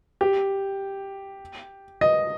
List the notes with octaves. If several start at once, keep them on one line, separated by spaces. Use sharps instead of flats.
G4
D#5